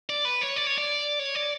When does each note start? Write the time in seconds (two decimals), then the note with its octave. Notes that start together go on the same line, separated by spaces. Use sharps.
0.10 D5
0.25 B4
0.41 C#5
0.56 D5
0.67 C#5
0.78 D5
1.19 C#5
1.35 D5